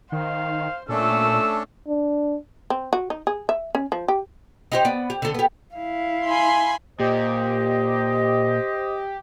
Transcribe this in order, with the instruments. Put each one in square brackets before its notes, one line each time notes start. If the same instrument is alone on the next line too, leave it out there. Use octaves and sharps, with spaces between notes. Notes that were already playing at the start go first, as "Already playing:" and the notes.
[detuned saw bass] D#3 [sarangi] C5 [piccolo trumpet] F5
[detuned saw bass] A#2 [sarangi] A3 [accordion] C#4 D4 A4 [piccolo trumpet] E6
[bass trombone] D4
[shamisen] C4
F#4
D#4
G#4
E5
C#4
F3
G4
[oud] D#4 G4 C5
B3 D5
G4
D3 A4
B3 G4
[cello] E4 F5
[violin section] G#5 B5 C6
[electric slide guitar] A#2 [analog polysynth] G4 [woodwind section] C5 D#5